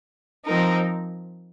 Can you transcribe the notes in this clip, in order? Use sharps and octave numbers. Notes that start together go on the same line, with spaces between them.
F3 C4 D#4 A#4